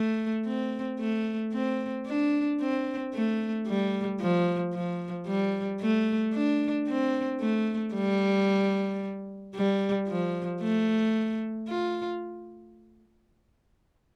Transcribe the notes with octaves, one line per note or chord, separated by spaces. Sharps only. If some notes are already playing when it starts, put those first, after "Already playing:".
Already playing: A3
C4
A3
C4
D4
C4
A3
G3
F3
F3
G3
A3
D4
C4
A3
G3
G3
F3
A3
F4